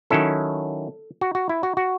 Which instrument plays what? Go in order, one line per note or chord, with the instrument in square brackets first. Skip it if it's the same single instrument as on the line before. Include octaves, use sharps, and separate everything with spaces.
[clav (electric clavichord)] D#3 F#3 C#4 E4 A4
F#4
F#4
E4
F#4
F#4